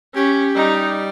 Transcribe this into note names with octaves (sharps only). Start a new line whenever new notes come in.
C#4 G4
G3 D#4